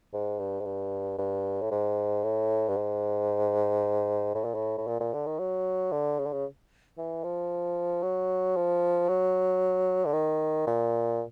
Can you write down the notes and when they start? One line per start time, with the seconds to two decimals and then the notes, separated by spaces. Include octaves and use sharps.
0.13 G#2
0.39 G2
0.60 G#2
0.65 G2
1.18 G2
1.62 A2
1.71 G#2
2.24 A2
2.69 G2
2.76 G#2
4.35 A2
4.44 A#2
4.54 A2
4.78 A2
4.87 A#2
5.00 A#2
5.14 D3
5.26 D#3
5.39 F#3
5.92 D3
6.19 C#3
6.26 D3
6.33 C#3
6.98 E3
7.24 F3
8.03 F#3
8.56 F3
9.09 F#3
10.06 D3
10.13 D#3
10.67 A#2